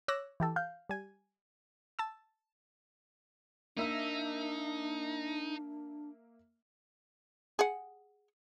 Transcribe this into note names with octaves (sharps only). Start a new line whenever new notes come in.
C#5 D6 E6 F#6 A#6
E3 G4 A4
F5 G6
G3 G#5
A5 E6
A#3 D4 D#4 E5 E6
G#4 F#5